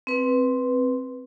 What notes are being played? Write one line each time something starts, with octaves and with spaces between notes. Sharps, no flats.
C4 B4